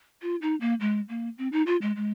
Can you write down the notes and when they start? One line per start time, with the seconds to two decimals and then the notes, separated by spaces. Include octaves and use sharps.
0.22 F4
0.42 D#4
0.61 A#3
0.81 G#3
1.09 A#3
1.38 C4
1.52 D#4
1.67 F4
1.82 G#3
1.96 G#3